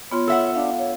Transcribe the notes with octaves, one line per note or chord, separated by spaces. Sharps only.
B3 F4 C#5 C6
A4 E5 F#5
D4 F5
C#5